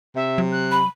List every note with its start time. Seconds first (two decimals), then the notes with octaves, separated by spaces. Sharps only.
0.16 C3 E5
0.38 F#3
0.52 F#6
0.72 B5